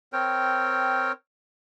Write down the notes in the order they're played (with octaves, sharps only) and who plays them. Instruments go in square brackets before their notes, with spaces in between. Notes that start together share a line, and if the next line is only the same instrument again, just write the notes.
[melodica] C4 A#4 C#5 G5